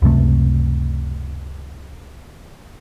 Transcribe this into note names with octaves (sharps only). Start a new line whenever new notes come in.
C#2 F#2 C3 A3